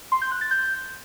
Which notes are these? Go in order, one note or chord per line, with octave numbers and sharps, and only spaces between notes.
C6
G6
F#6
A6
G6